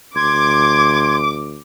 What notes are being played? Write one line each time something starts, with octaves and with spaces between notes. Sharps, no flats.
D2 C6 D6 G#6